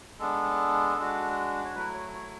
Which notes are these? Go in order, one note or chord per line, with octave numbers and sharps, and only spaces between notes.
G#3 B3 D4 A4
G#3 D4 F#4
C#5
F#3 A3 E4 B4
C#5
C#5